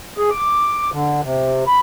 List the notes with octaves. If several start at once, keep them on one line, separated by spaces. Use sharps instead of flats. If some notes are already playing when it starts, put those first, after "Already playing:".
G#4
D6
D3
C3
B5